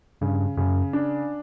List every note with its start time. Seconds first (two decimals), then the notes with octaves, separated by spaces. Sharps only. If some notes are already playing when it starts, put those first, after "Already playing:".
0.21 G2 C#3
0.57 F#2 C#3
0.93 D4